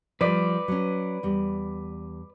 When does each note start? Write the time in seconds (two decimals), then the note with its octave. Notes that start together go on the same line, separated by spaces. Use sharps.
0.21 F3 G3 B4 D5
0.68 F#3 C#4
1.23 E2 G3